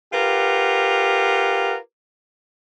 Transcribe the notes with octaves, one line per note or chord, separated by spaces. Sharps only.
F4 G4 A#4 B4 F#5